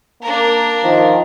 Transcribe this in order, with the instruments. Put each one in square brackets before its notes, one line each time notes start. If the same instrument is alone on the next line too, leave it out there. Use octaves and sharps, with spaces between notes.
[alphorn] A#3 [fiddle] D4 A#4
[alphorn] D#3 [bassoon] F3